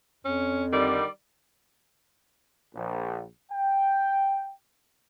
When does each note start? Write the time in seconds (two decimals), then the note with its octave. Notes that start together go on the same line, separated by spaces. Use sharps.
0.25 F2 C#4
0.73 D3 D#3 G3 D5
2.74 A#1
3.51 G5